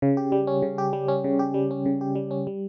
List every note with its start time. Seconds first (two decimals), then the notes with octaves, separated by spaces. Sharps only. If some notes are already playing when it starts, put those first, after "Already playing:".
0.02 C#3
0.17 G4
0.32 G3
0.47 C#4
0.62 C#3
0.78 G4
0.93 G3
1.08 C#4
1.24 C#3
1.39 G4
1.54 G3
1.71 C#4
1.86 C#3
2.01 G4
2.15 G3
2.31 C#4
2.47 G3